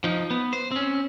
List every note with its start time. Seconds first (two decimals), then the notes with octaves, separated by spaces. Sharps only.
0.04 F3 D#4
0.31 B3
0.53 C5
0.72 C4 C#4